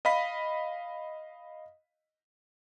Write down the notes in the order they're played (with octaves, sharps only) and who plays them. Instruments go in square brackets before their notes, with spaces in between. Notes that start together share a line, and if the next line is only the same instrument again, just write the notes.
[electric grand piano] D#5 F5 B5 B6